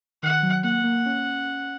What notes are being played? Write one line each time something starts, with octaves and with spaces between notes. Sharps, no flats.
D#3 F#5
F#3
A#3 F#5
A#3
C#4